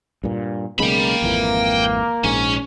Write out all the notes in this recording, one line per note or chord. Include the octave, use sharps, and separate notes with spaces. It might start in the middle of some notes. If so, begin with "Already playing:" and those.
G2 A#2
B1 C#3 G#3 A#3 G5 B5
G#1 F2 E3
A#1 G#2 C#4